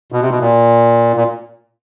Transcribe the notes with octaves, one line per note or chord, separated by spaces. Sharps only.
B2
C3
B2
A#2
A#2